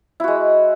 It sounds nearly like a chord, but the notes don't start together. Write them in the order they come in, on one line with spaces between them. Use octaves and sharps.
E4 F#4 G#3